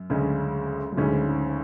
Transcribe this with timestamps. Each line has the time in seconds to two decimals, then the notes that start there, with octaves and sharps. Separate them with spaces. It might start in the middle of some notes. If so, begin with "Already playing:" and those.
Already playing: F#2
0.10 D2 C#3 G#3 C#4
0.92 F#2
0.97 D2 G#2 C#3 G#3 C#4
1.27 G#2